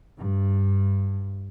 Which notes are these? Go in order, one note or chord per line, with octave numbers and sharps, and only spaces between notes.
G2